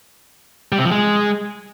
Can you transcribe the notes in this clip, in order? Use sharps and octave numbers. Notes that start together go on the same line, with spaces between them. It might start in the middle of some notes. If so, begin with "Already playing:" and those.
G3
C3
F3
G#3